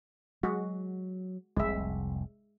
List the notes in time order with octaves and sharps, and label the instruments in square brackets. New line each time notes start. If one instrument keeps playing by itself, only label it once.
[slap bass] F#3 [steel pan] G#3 F#4
[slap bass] F1 C2 [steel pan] G#3 E5